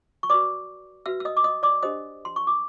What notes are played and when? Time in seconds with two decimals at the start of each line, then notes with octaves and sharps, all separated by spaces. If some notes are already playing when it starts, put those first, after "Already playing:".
0.23 C#6
0.30 F#4 B4 D5 D6
1.06 F#4 B4 E5 E6
1.20 E6
1.25 D#5 D#6
1.37 D6
1.44 D#5 D#6
1.63 D5 D6
1.82 D4 G4 C5 D#5 D#6
2.25 C6
2.36 C#6
2.47 D6